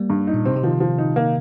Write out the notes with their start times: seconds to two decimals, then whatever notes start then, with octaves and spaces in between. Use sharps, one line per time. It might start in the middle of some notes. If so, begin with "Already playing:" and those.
Already playing: G3 A#3
0.10 G2
0.27 D#4
0.34 A#2
0.45 C3 C4
0.56 C3
0.63 D#3 F3
0.80 F3
0.98 D#4
1.16 A#3